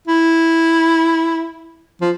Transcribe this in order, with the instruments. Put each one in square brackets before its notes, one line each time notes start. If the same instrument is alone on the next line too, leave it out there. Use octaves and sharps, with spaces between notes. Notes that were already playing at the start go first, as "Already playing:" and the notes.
[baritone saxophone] E4
F3